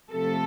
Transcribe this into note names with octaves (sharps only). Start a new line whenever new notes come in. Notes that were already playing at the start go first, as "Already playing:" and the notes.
C3 F3 A3 A4